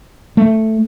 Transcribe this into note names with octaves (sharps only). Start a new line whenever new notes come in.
A3